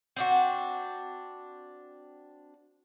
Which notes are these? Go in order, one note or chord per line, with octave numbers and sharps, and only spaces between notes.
C4 D4 F#4